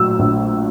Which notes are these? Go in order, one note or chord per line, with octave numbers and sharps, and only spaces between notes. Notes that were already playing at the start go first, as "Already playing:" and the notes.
Already playing: A#1 A2 F#3 E6
A#1